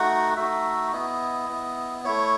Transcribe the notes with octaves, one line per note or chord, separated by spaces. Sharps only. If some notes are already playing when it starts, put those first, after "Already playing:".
Already playing: A3 D#4 F#4 F#5
A3 D#4 F#4 E5
B3 E4 D#5
B3 E4
A3 E4 C#5